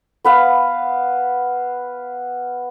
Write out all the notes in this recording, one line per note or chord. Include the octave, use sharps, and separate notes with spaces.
B3 B4 F5